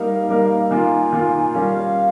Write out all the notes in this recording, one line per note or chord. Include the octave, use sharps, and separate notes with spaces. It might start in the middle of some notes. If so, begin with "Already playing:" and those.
Already playing: G3 A#3 D#4 A#4 F5
G3 A#3 D#4 A#4
D#3 A#3 F4 G#5
D#3 A#3 F4
G3 C#4 F4 A#4 F5